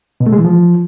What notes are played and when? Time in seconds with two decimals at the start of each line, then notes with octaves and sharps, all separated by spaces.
0.20 B2
0.26 A3
0.33 G#3
0.39 E3
0.45 F3